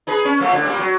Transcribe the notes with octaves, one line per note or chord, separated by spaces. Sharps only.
D#4 G#4 B4
C#4
F3 A3 A#3
A2 D3
A#2 G3
F#3